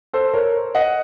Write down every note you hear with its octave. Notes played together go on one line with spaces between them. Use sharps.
A4 C5
A#4 C#5
D#5 F#5